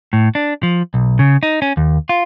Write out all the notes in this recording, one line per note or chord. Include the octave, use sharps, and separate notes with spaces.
A2
D4
F3
B1
C#3
D#4
C#4
D#2
F4